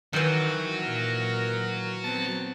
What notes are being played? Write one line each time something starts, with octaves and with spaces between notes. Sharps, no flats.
D#3 E3 F#3 F#4
A#2 A#4
B3 C4 A5